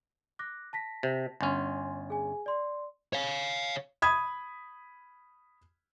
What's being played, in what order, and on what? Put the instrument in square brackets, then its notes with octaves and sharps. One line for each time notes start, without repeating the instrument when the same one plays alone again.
[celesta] D6 F#6 A#6
A5 A#6 B6
[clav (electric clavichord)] C3
[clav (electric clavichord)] G1 C#4 [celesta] G#5 C6
[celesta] G#4 G#5
D5 C6
[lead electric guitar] C#5 F5
[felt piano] B5 D#6 G#6